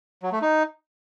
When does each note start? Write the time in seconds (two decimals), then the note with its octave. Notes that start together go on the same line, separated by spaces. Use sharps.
0.23 F#3
0.32 A3
0.42 D#4